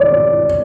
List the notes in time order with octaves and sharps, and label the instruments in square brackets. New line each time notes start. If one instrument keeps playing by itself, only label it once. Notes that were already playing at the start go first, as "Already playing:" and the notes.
Already playing: [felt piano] C#5 D5